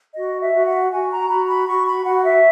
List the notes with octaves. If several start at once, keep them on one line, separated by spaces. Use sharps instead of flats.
F#4 D#5
E5
F#4
F#5
F#4 G#5
A#5
F#4 B5
B5
F#4 C#6
B5
F#4 F#5
E5